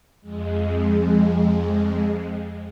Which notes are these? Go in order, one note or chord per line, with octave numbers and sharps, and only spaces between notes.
F2 G#3